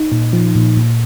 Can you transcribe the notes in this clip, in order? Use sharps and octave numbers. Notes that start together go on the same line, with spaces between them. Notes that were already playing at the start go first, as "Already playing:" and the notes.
Already playing: D#4
A#2
F3
A#2
A#2